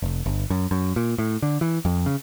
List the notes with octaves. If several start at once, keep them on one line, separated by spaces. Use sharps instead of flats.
F1
G1
F#2
F#2
A#2
A2
D3
E3
F2
C#3